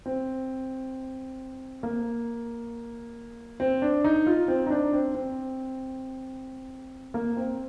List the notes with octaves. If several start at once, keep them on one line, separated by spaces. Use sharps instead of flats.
C4
A#3
C4
D4
D#4
F4
C4
D#4
D4
C4
C4
A#3
C4